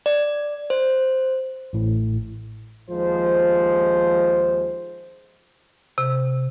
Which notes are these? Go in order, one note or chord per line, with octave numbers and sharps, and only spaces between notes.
D5
C5
A1 A2
D#2 F3 G#3 C5
C3